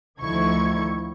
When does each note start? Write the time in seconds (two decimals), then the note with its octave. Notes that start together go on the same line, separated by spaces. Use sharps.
0.19 D2 D#3 F3 E4 C#6 G#6